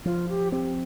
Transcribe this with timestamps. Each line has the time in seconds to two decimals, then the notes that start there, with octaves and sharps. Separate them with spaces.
0.05 F3 F4
0.29 G4
0.52 C4 G4